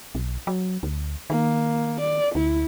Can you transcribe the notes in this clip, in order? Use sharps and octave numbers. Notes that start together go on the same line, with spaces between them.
B1
F#3
D2
D#3 A#3
D5
D2 E4